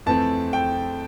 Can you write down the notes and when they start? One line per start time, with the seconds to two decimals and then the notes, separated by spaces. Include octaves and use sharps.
0.06 F2 E3 A3 C4 A5
0.53 G5